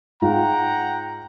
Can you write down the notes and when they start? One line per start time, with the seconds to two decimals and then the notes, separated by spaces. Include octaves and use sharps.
0.22 G#2 F4 F#5 G5 A#5